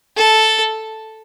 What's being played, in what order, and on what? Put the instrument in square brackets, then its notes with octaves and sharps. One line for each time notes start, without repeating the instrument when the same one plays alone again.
[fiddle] A4